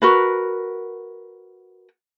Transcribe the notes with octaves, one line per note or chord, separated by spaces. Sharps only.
F#4 A#4 B4